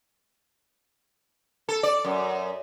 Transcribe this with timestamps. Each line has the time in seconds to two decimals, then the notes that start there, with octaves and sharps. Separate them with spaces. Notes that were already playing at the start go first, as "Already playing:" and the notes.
1.69 A4
1.83 D5
2.05 F#2